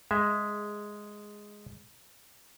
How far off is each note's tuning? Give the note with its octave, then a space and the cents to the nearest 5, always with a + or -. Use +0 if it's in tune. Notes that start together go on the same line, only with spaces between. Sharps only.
G#3 +0 E5 +0